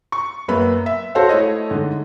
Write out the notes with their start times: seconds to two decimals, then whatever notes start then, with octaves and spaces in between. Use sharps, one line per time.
0.12 C#6
0.48 F#2 A#3 B3 B5
0.86 E5
1.15 F#4 A4 C5 C#5 F5 F#5
1.29 A3 E4 C#5 D#5
1.70 G#2 D3